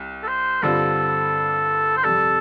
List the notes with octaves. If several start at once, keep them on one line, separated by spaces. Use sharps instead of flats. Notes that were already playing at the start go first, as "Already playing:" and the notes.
Already playing: C2
A4
C5
G2 D3 G3 C4 F4 A4
C5
F2 C3 G3 A4